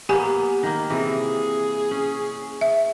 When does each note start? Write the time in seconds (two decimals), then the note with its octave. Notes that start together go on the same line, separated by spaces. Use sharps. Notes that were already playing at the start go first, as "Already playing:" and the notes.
0.09 A#3 B3 G4 G#5
0.63 D#3 A#3
0.90 C3 E3 G#4
1.91 C#4
2.61 E5